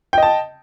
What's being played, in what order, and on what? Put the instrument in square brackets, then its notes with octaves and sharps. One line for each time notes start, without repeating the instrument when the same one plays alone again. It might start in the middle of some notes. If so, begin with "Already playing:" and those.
[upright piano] G5
D#5
A5